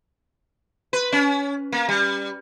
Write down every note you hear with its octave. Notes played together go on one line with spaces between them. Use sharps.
B4
C#4
A#3
G3